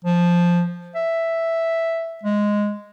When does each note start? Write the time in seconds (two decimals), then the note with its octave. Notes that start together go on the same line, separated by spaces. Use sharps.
0.05 F3
0.95 E5
2.23 G#3